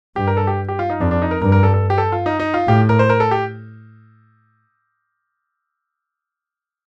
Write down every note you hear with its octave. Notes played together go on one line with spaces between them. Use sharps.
G2 G4
A#4
A4
G4
G4
F4
D#4
F2 D4
D4
D#4
A#4
G2 A#4
A#4
A4
A4
G4
A4
F4
D#4
D#4
F4
A2 G4
A#4
C5
A#4
A4
G4